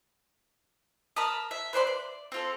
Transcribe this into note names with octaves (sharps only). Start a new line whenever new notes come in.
A#4 A5 B5 D#6
E5
B4 C5 D5 C6
D5
C4 F4 A4